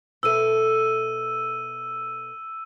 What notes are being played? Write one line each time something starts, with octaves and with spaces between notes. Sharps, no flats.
B2 A4 E5 E6 D#7